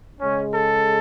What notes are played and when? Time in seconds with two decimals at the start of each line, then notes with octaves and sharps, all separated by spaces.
0.21 C#3 G#3 C#4
0.50 A4